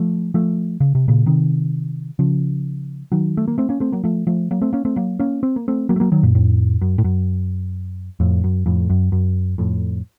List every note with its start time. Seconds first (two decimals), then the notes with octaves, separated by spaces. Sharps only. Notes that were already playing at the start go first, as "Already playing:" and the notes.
Already playing: F3 A3
0.34 F3 A3
0.80 C#3
0.95 C3
1.08 A#2 C#3
1.26 C3 D#3
2.19 C#3 F3
3.12 D#3 F#3
3.37 A3
3.48 A#3
3.58 A3 C4
3.69 A#3 C#4
3.80 A3 C4
3.92 F#3 A#3
4.04 F3 A3
4.27 F3 A3
4.51 F#3 A#3
4.62 A3 C4
4.73 A#3 C#4
4.85 A3 C4
4.96 F#3 A#3
5.19 A#3 C#4
5.43 C4
5.56 A#3
5.68 A3 C4
5.89 F#3 A#3
5.96 A3
6.00 F#3 A#3
6.12 D#3 F#3
6.23 F#2 A#2
6.35 F2 A2
6.81 F#2
6.98 A2
7.04 F#2
8.20 F2 A2
8.44 F#2
8.66 F2 A2
8.90 F#2
9.12 F#2
9.58 F2 A2